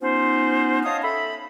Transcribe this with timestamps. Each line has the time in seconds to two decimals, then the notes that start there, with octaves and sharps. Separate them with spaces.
0.01 B3 C#4 D#4 F4 C5
0.84 C#5 D#5 F5 A5 D#6
1.03 A4 E5 B5